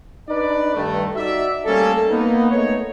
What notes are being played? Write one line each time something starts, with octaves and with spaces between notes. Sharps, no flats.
D4 D#4 B4 D5
G2 D#3 A3
D#4 F#4 D5 E5
G3 A3 A#3 C#4 A4
A#3 B3 D#4
A3 B3 D#4 C#5